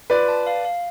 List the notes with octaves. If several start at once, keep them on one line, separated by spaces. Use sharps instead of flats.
F4 B4 D5
A5
F5
F5